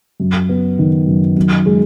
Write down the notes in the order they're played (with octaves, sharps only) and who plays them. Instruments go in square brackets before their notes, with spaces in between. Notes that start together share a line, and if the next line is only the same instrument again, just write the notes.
[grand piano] F#2
B3
D#3
F#2
F#2
G#3